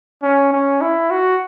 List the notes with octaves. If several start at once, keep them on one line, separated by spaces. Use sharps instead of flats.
C#4
C#4
E4
F#4